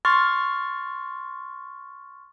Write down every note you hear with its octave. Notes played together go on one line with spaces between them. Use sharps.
C6 C#6 F6 A6